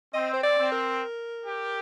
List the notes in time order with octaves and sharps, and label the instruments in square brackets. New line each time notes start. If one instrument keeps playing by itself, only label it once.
[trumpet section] C4 [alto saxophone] D#5
[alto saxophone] C5
D5
[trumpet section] C4
[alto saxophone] A#4
[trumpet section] G4